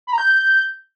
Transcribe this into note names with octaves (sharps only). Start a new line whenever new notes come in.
B5
A#5
G6